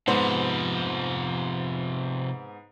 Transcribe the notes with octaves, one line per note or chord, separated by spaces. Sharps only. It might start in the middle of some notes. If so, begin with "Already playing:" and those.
G#2 C3 F3 B3 C5